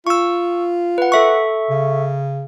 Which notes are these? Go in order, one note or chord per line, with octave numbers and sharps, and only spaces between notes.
F4 C#6 E6
B4 F#5
A4 E5 C#6
C#3